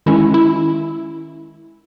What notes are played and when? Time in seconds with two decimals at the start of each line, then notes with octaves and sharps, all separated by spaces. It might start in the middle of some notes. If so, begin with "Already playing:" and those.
0.06 D#3 G#3 C#4 E4
0.34 E4